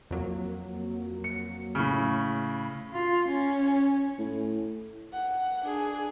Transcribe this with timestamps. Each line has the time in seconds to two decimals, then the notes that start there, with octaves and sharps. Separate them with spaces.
0.11 F2 F#3 A#3
1.24 C#7
1.75 A2 C#3
2.93 F4
3.28 C#4
4.19 A2
5.13 F#5
5.62 D4 G#4